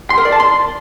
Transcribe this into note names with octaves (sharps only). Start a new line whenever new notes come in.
C6
A#4
D5
A5
C6